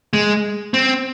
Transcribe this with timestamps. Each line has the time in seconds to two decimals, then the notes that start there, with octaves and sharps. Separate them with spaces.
0.13 G#3
0.74 C4